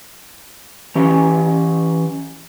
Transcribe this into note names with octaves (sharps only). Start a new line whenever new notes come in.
E3 C#4 G4